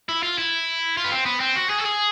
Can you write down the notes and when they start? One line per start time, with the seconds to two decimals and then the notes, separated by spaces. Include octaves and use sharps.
0.09 E4
0.23 F4
0.38 E4
0.97 F4
1.04 B3
1.12 C4
1.26 B3
1.40 C4
1.56 F#4
1.70 G#4
1.81 A4
1.86 G#4